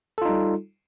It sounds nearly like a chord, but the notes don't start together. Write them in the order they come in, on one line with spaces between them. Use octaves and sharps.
A4 F4 D#4 G3